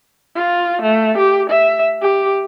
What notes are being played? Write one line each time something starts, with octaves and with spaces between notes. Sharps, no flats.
F4
A3
G4
E5
G4